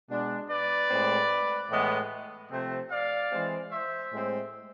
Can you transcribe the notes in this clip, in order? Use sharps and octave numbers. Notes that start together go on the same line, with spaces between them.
B2 G#3 D4
B4 D5
A2 G#3 C4
A2 E3 G#3 B3
C3 F3 A3 C4
D5 F5
E3 G#3 C4
C5 E5
A2 G#3 C4